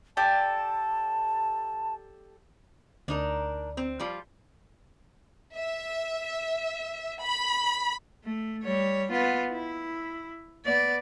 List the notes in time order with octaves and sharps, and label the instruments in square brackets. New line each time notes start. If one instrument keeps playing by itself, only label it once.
[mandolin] G4 A4 D5 [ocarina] A5
[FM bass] D2 [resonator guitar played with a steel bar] D4 D#4 A#4
[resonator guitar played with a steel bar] C4
F3 G3 F4
[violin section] E5
B5
[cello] A3
G3 C#5
B3 F4
E4
B3 D5